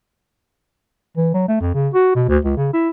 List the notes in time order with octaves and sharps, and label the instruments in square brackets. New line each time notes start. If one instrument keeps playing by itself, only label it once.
[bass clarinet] E3
F#3
A3
F2
C#3
F#4
B2
D2
C#2
C#3
E4